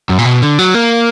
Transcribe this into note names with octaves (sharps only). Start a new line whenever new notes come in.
F#2
A#2
B2
D3
F#3
A#3